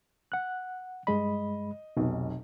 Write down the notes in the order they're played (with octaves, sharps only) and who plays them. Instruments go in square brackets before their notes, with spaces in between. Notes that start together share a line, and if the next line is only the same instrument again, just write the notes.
[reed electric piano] F#5 F#6
[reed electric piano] G2 G#3 B5 [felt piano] D#5
[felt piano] F1 B1 [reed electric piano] B2